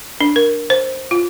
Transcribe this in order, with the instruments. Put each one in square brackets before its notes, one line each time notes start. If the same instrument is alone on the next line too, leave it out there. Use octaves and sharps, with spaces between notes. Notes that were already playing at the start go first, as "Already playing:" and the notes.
[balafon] D4
A#4
C5
F4